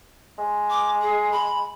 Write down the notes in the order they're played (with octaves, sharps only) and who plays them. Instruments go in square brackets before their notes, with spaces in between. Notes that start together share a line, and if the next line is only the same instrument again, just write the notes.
[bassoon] G#3
[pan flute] D6
G#4
B5